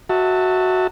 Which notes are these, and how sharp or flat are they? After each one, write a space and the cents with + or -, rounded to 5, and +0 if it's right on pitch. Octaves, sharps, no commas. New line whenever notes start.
F#4 +0 E5 -20 A5 +20